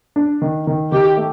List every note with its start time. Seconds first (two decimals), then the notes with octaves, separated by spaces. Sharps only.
0.16 D4
0.42 D#3
0.67 D#3
0.92 D#3 G4
1.17 A3